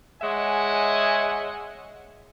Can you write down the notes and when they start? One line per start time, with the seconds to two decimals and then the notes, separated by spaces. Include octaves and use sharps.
0.22 G#3 C#5 D#5 E5 F#5 G#5